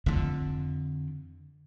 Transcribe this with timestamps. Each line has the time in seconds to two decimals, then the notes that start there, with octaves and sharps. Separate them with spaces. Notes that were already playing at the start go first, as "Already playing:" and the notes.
0.06 F2 D3